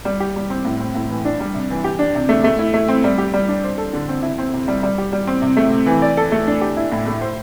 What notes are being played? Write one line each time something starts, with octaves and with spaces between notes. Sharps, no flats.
G3
G4
G3
C4
A2
C4
A2
E3
D4
G3
C3
E3
G4
D4
C3
A3
A3
E4
A3
C4
G3
G4
G3
D4
C5
A4
D3
C4
E4
C4
C3
G3
G3
G4
G3
C4
C3
A3
C3
E3
D5
A4
A3
D4
G4
E4
A2
A3
C5